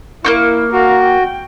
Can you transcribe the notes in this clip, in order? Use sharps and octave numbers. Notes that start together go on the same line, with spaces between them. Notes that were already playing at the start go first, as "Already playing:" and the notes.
A#3 D#4 E4 C#6
F#4 A#4 F5
G5